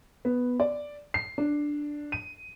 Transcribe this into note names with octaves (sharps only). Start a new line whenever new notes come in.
B3
D5
C7
D4
D#7